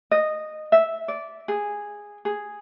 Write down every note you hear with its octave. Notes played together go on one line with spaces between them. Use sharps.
D#5
E5
D5
G#4
G#4